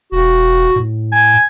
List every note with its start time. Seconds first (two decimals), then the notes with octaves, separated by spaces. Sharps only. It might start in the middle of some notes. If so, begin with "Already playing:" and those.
0.12 E1 F#4
0.76 A2
1.12 G#5